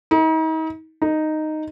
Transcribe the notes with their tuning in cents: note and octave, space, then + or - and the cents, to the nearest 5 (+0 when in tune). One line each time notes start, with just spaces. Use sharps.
D#4 +40
D#4 -5